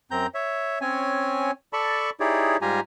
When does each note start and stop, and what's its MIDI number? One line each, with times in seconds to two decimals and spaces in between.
0.11 0.27 42
0.11 0.27 60
0.11 0.27 82
0.11 0.27 91
0.34 0.79 73
0.34 0.79 76
0.81 1.51 60
0.81 1.51 61
0.81 1.51 73
0.81 1.51 80
1.73 2.10 69
1.73 2.10 74
1.73 2.10 81
1.73 2.10 83
1.73 2.10 85
2.20 2.57 63
2.20 2.57 64
2.20 2.57 67
2.20 2.57 68
2.20 2.57 73
2.20 2.57 74
2.62 2.80 44
2.62 2.80 55
2.62 2.80 65
2.62 2.80 67
2.62 2.80 80
2.62 2.80 82